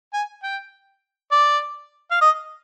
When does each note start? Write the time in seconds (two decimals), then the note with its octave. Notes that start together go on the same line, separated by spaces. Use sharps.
0.13 G#5
0.43 G5
1.32 D5
2.11 F5
2.21 D#5